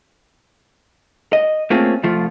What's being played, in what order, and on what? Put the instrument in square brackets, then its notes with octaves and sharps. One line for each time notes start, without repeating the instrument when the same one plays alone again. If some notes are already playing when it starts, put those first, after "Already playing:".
[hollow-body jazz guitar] D#5
A3 A#3 C4 C#4 F4 G#4
C2 F3 A3 F4